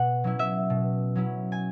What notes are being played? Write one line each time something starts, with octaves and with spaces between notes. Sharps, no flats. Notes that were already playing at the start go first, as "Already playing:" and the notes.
Already playing: B2 F#5
F#3 C#4 E4
E5
B2
F#3 C#4 E4
G#5